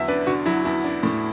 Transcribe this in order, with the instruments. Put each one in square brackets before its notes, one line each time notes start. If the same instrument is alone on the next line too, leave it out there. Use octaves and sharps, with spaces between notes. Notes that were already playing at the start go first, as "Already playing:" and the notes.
Already playing: [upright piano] E2 D3 F#3 [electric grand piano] E5
[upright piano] D4 [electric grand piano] B4
[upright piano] D3 [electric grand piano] F#4
[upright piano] F#3 [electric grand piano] E4
[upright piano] E2 [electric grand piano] E4
[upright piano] D4
A2